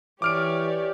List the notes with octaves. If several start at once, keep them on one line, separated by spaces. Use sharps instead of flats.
E3 G4 C#5 D5 D6 F6 D7